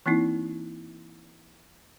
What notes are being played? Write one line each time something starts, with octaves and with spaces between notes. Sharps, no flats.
E3 A#3 C4 D#4 E4